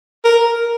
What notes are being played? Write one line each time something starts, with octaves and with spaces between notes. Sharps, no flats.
A#4